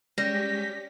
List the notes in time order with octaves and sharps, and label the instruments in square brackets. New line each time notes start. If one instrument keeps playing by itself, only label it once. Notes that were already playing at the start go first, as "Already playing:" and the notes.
[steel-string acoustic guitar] G3 [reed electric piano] G#3 [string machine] C#4 G4 B6 [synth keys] A#6